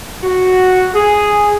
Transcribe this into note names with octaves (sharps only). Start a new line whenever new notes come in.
F#4
G#4